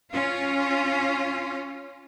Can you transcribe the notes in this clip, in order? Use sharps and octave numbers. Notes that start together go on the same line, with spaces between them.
C#4 F4